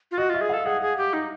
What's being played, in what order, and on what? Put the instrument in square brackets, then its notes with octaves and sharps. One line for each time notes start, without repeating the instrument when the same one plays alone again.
[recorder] F4
[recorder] F#4 [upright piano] D#5
[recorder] F4 [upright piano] E5
[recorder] G#4
[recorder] A4 [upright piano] F5
[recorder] G#4 [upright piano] F#5
[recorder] G#4
G4
D#4